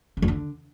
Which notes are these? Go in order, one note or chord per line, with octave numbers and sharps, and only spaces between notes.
C#3
F2
D3